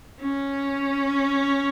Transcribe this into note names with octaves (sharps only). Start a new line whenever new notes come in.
C#4